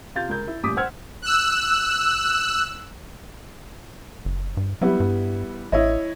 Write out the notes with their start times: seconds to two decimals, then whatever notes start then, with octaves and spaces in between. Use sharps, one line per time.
0.15 C3 F4 F5 G6 A6
0.29 C#2 A#4 G6
0.47 E4
0.63 A1 A#2 G3 D6 D#6 B6
0.77 C5 F#5 E6 F6 G#6
1.22 E6 F#6
4.25 F#1
4.57 G2
4.81 F#3 G3 B3 E4
5.00 G2
5.72 A1 E4 C#5 D#5